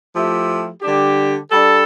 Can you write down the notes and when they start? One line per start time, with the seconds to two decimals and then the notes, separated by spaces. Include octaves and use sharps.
0.14 F3 A3 E4 G4
0.82 D3 G3 D4 G4
1.51 G3 D4 A4